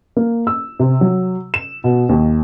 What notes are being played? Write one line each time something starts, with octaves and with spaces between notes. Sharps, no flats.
A#3
E6
C3
F#3
E7
B2
D#2